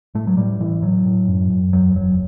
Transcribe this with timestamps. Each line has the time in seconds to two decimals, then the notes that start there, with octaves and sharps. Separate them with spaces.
0.15 A2 A3
0.27 F#3
0.37 A2 G3
0.60 A2 E3
0.82 A2 F#3
1.06 A2
1.28 F#2
1.50 F#2
1.73 E2 F#3
1.95 F#1 F#3